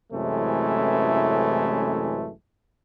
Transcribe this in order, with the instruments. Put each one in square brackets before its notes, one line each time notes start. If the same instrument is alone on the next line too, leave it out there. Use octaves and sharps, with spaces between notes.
[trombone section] A1 F#2 C3 E3 G#3 A3